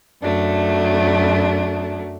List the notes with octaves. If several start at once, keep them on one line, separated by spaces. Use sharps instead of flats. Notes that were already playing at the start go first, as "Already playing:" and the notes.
F#2 F#3 A3 D4